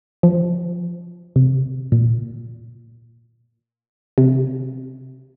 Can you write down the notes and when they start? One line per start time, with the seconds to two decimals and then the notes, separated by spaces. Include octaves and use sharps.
0.23 F3
1.36 C3
1.92 A#2
4.18 C3